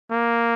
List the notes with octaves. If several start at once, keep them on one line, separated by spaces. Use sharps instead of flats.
A#3